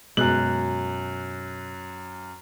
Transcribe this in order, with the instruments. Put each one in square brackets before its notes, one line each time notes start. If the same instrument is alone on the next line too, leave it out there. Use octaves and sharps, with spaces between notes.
[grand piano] F#2 F#6 F#7 [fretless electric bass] B2 G#3